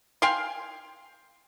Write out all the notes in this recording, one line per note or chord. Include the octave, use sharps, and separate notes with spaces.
F5 G5 G#5 C6